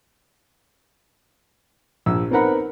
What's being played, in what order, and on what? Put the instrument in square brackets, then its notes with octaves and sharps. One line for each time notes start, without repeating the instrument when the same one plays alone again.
[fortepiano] A#1 E6
B3 C4 D#4 A#4 F#5 B5